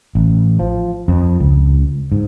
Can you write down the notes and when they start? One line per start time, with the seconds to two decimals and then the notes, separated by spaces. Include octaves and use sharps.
0.15 A1
0.59 F3
1.08 F2
1.40 C#2
2.12 G#2